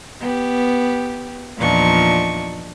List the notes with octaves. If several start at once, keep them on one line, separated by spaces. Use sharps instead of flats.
B3 G4
E2 A#2 F3 D4 D#4 C#6